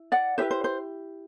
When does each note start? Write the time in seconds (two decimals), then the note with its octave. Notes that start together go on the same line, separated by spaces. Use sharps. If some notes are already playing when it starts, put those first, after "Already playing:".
Already playing: E4
0.12 D5 F#5
0.38 E4 G4 B4 C5 E5
0.51 C5
0.64 C5